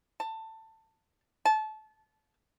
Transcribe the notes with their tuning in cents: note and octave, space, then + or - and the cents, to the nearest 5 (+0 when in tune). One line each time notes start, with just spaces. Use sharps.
A5 +20
A5 -25